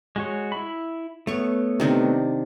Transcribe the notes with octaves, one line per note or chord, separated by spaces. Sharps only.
G#3 F#4 C#5
E4 B5
A3 B3 C#5 C#6
C3 D#3 D4